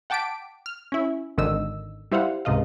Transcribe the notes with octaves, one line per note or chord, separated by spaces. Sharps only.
F#5 G5 A5 D6 B6 D7
F6
C#4 E4
G#1 D3 D#3 D#5 E6
G3 E4 C5 F5 F#5
C#2 G#2 C3 D#5 F5